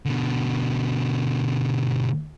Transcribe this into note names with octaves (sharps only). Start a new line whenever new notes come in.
B2 D3